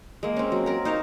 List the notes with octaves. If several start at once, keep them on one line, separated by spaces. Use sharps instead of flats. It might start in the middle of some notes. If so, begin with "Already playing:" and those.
G#3 A#3
C4 C#4
F#3
C4 A#4
D#4 C5 C#5 F5